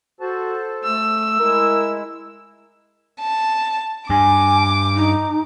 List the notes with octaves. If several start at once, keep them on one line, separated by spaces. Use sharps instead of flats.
F#4 A4 C5 A5
A3 E6
G#3 E4 A#4
A5
G2 G#5 D6
D#4